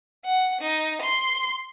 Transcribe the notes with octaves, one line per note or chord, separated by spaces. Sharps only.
F#5
D#4
C6